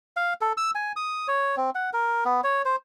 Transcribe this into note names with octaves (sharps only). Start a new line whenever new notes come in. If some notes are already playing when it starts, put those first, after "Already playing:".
F5
A4
E6
G#5
D#6
C#5
C4
F#5
A#4
B3
C#5
C5